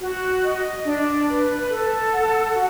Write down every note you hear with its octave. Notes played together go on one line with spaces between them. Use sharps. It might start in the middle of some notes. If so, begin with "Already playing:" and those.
F#4
D#5
D4
B4
A4
F#5
F#4